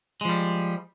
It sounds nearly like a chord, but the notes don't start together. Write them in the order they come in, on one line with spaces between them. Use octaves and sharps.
G#3 F3 G3